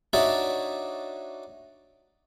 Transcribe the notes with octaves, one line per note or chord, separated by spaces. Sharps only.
D4 D#4 F#4 C#5 D5 E5